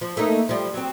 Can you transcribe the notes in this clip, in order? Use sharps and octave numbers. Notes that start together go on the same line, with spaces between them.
F3
A3 A#3 D#4
F3 G3
F#3 C4